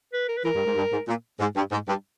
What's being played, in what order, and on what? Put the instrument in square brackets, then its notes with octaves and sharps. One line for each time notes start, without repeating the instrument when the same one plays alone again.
[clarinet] B4
A#4
B4
[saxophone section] E3 [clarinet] A#4
[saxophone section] G2
G#2
G2
G#2
A#2
G#2
G2
G#2
G2